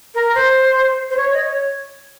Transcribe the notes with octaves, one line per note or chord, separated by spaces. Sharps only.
A#4
C5
C5
C#5
D#5
C#5